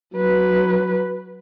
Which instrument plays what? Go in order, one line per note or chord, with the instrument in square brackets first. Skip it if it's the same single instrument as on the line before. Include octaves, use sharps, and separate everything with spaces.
[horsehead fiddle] F#3 B4